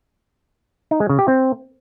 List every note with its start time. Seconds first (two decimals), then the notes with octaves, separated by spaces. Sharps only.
0.91 D#4
1.00 G#3
1.09 C#3
1.19 G4
1.28 C4